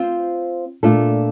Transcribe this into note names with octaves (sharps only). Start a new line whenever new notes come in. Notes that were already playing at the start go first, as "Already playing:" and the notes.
Already playing: C4 F4 C5
A#2 A3 D4 F4 A4